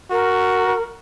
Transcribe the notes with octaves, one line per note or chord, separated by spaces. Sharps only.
F#4 A#4